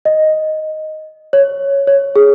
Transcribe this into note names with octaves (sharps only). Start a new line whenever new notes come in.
D#5
C#5
C#5
G#4